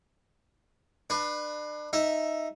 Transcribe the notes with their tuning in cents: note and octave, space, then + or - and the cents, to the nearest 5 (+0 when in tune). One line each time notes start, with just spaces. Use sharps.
D4 +35 B4 +0
D#4 +0 E5 +0